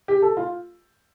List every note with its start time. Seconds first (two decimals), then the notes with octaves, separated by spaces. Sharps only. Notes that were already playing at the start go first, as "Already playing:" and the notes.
0.08 G4
0.22 A4
0.37 F4